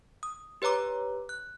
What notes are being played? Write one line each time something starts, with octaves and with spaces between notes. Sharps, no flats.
D#6
G4 B4 C#5 A#5 D6
F#6